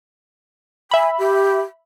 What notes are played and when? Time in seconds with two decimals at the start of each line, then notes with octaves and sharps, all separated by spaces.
0.91 E5 G#5 B5
1.19 G4